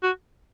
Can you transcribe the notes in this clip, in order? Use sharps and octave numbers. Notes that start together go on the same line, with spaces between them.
F#4